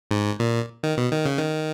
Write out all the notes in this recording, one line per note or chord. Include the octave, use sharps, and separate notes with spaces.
G#2
A#2
D#3
B2
D#3
C#3
D#3